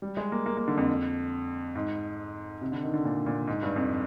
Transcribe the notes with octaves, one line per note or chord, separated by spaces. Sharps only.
G3
G#3
A#3
A#3
A#3
D3
F2
G#2
C3
D3
D#3
D3
A#2
A#2
G#2
G2
F2